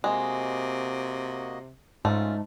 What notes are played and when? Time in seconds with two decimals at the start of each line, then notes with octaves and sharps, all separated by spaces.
0.04 C3 G#3 A#3 F#4 D#5
2.05 G#2 A3 C#4 F4